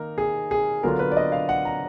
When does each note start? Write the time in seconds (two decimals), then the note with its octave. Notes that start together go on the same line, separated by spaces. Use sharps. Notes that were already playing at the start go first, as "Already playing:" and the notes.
Already playing: D#3 A#3 D#4 A#4
0.18 G#4
0.51 G#4
0.83 D3 F#3 B3 D4 F4 A#4
0.99 B4
1.12 D5
1.17 D#5
1.32 F5
1.49 F#5
1.65 A#5